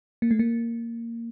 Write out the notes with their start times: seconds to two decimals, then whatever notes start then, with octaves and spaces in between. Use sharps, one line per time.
0.22 A#3
0.31 A3
0.39 A#3